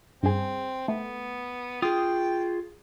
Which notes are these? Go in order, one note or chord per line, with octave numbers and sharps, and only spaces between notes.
G2 C4 G#4
A3 B3
F4 G#4 G5 D#6